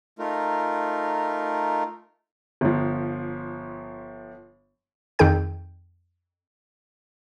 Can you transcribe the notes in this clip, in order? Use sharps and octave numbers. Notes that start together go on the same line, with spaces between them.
A3 D#4 F4 A#4
G1 F3
F2 D#3 D#4 G#4 G5 G6